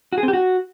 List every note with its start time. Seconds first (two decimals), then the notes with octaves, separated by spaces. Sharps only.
0.13 F#4
0.18 G#4
0.23 C4
0.28 G4
0.33 F#4